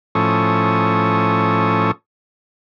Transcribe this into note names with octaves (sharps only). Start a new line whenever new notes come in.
A2 F3 C#4 A4 C#6 D#6